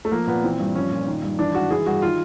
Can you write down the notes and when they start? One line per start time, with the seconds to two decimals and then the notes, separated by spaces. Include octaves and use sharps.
0.05 A3
0.12 F3 A#3
0.27 A#2 B3
0.44 E3 C4
0.59 G2
0.75 F3 C#4
0.91 A#2
1.07 D#3
1.23 G2
1.39 E3 D4
1.54 G#2 F#4
1.70 E3 G#4
1.86 G2 F#4
2.02 D#3 F4